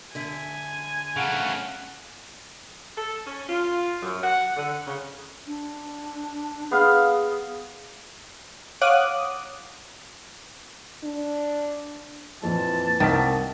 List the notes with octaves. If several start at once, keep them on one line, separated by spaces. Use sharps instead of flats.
D3 E5 G#5
C#3 A3 F5 F#5
A4
C#4
F4
F#2
F#5
D3
C#3
D4
B3 G#4 F5
C#5 F5 F#5 D6 D#6 F#6
D4
F2 A#2 E3 A5
C2 D#3 B6